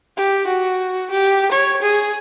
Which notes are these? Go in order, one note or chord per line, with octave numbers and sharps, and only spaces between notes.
G4
F#4
G4
C#5
G#4